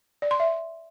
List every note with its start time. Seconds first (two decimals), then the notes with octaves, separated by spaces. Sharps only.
0.22 D5
0.31 C6
0.40 E5